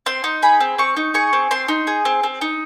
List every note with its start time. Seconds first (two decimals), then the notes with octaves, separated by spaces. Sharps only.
0.06 C4 C6
0.24 D#4
0.42 G#4 B5
0.60 C4
0.78 C4 C#6
0.97 D#4
1.14 G#4 C#6
1.33 C4
1.51 C4 C6
1.68 D#4
1.87 G#4
2.05 C4
2.23 C4
2.41 D#4